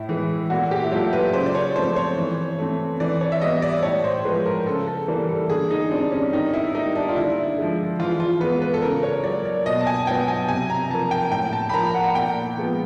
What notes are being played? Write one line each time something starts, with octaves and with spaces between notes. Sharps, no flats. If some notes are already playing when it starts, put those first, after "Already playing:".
Already playing: A2 E4
E3 G#3
A#2 F#4
G4
E4
F#3 A3 F4
B4
C#3 C5
D5
C#5
F3 A3 C4 C5
C#5
E3
A3 C4
E3 D5
C#5
E5
G3 B3 D#5
D5
A2 C#5
C5
F3 G#3 B4
A#4
C#3 A4
A4
E3 G3 A#3
A4
D3 G#4
D#4
G3 C4 D4
C#4
D#3 D#4
E4
G3 A#3 D#4
D4
F4
D3 E4
F3 G#3
E3 F4
F4
G#3 B3 B4
B4
A4
C#3 A#4
C#5
F#3 A#3 D5
D5
B2 D#5
A5
G#5
F#3 B3 G5
G#5
C3 G#5
A#5
F3 A#3 A5
G5
A2 G5
A5
B5
F3 A#3 A#5
F#5
A#2 G5
F3 G#3 B3